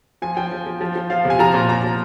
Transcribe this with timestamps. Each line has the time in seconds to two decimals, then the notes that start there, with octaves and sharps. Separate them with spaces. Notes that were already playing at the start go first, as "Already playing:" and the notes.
0.22 F3 G#5
0.37 F3 G5
0.51 F3
0.67 F3
0.81 F3
0.96 F3
1.10 F3 F5
1.25 C3
1.30 G#5
1.39 F3 A#5
1.54 A#2
1.69 A#2 A#5
1.84 F3